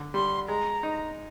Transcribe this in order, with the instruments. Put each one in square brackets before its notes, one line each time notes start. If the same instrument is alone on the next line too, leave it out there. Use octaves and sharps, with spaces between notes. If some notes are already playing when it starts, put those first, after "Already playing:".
Already playing: [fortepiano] D3
[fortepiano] G3 [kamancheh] C6
[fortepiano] G#3 [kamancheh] A#5
[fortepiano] D#4